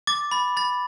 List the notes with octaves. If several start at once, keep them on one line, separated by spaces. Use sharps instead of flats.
D6 A6
B5 A6
B5 A6